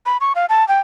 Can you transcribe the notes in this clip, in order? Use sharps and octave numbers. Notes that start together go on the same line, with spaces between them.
B5
C#6
F5
A5
G5